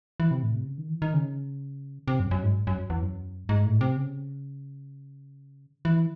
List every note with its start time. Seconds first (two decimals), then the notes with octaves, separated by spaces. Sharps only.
0.20 E3
0.31 C3
0.43 A2
0.54 C3
0.66 C#3
0.78 D#3
0.89 E3
1.02 D#3
1.14 C#3
2.08 C3
2.20 F#2
2.31 F#2
2.43 G#2
2.67 F#2
2.90 E2
3.02 F#2
3.49 G#2
3.65 A2
3.81 C3
3.96 C#3
5.85 E3